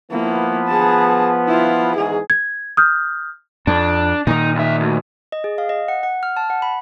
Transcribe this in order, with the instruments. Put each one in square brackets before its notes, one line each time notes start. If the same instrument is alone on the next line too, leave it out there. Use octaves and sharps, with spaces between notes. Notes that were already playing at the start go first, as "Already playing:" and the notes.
[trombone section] F3 B3 [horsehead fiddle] A#3 E4
[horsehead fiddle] G#4 A5
E4 F4
[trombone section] E2 G#2 [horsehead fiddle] G#4
[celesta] G#6
D#6 F6 G6
[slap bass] F2 [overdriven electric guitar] D4
[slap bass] A#2 D#3 [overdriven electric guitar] D#4
[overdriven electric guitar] D#2 E5
D2
[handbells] D#5
G#4
F5
D#5
F#5
F#5
F6
A5
F#5
B5